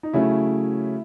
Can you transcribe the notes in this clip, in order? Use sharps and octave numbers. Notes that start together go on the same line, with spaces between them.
D#4
C#3 F#3 A3 C#4 E4